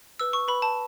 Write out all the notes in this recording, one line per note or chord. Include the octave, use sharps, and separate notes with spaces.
B4 E6
C#6
B4 B5
A5